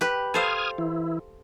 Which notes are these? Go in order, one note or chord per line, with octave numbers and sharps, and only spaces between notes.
G4 B4
A4 C5 F5 D#6 F6 G#6
E3 E4